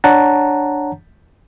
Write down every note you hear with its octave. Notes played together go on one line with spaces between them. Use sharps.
D4 C#5 F#5 A5 A#5